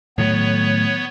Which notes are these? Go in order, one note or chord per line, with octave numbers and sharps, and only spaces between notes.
A2 D#3 F#3 B3 C#5